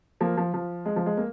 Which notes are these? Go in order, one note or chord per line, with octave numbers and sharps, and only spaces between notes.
F3 A#3
F3
F3
G#3
F3
G#3
A#3